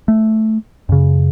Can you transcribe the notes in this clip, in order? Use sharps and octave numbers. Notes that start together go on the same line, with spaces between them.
A3
F#2 C#3